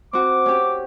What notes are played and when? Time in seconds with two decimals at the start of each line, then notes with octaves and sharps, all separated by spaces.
0.13 C4 F#4 D6
0.46 C#4 G4